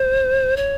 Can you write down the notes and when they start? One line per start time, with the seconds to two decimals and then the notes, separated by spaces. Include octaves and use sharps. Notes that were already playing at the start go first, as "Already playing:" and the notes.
Already playing: C5
0.57 C#5